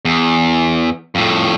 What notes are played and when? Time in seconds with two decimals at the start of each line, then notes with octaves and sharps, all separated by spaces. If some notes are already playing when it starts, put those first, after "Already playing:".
0.05 E2
1.15 F2 A2